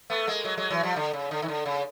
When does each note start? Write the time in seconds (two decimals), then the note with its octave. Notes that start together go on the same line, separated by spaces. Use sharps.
0.10 A3 B3
0.27 G#3 A#3
0.44 F#3 G#3
0.57 F#3 G#3
0.70 E3 F#3
0.83 F3 G3
0.96 D3
1.13 C#3
1.31 D3
1.42 D#3
1.48 D3
1.66 C#3